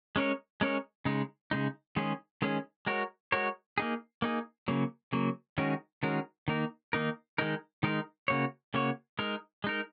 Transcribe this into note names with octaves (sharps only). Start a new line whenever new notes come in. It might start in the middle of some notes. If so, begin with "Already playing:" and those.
G#3 C#4 A#4 C#5
G#3 C#4 A#4 C#5
C#3 G#3 D#4
C#3 G#3 D#4
D#3 G#3 C#4 G#4
D#3 G#3 C#4 G#4
G#3 F#4 A#4 C#5
G#3 F#4 A#4 C#5
A#3 D#4 G#4
A#3 D#4 G#4
C#3 F#3 A#3
C#3 F#3 A#3
D#3 G#3 C#4 F#4 A#4
D#3 G#3 C#4 F#4 A#4
D#3 A#3 D#4 A#4
D#3 A#3 D#4 A#4
D#3 G#3 D#4 A#4
D#3 G#3 D#4 A#4
C#3 A#3 F#4 C#5
C#3 A#3 F#4 C#5
G#3 D#4 A#4
G#3 D#4 A#4